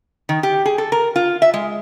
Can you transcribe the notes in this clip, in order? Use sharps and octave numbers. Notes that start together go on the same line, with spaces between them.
D#3
G4
G#4
A4
A#4
F4
E5
G#3